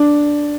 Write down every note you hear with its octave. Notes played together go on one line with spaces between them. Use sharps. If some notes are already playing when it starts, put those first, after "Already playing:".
Already playing: D4